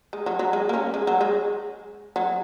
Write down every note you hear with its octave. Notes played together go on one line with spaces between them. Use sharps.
G#3
F#3
F#3
G#3
A#3
C#4
G#3
F#3
G#3
F#3